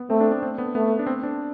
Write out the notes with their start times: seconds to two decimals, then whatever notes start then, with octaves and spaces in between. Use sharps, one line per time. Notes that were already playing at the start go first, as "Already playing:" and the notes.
Already playing: B3
0.10 A3 C4
0.21 D4
0.31 D4
0.42 C4
0.58 B3
0.75 A3 B3
0.99 D4
1.07 C4
1.23 D4